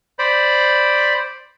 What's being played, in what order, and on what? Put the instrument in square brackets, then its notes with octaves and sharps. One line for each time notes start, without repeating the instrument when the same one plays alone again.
[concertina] C5 D5 B5